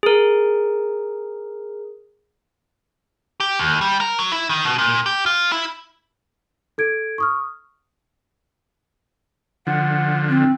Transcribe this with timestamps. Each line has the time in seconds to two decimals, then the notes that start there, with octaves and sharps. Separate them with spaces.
0.03 G#4 A#4
3.40 G4
3.59 D#2
3.81 G3
4.00 A#4
4.19 F#3
4.32 E4
4.50 D#3
4.65 B2
4.78 A#2
5.06 G4
5.26 F4
5.52 E4
6.78 A4 G#6 D7
7.18 C#6 D#6 F6
9.67 D3 F3 F#5
10.29 C4